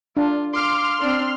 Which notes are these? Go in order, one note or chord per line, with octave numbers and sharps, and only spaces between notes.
D4 F4
F5 C6 D6 F6
C4 D4